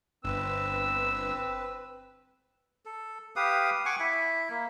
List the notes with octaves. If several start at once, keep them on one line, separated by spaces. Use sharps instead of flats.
G1 C4 B4 E6
A4
G4 B4 F5 D#6
F#5 G#5 C#6 D6
E4 E5
A#3